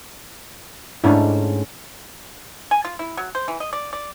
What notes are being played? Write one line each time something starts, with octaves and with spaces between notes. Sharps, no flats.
G#2 A3 C#4 D4 E4
G#5
F4
E4
F#3
C5
E3
D#5
D5
D5